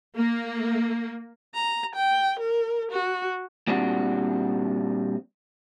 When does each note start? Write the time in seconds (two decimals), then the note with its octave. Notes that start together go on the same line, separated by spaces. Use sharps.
0.16 A#3
1.55 A#5
1.96 G5
2.40 A#4
2.92 F#4
3.67 A#2 G3 C4 D4 F#4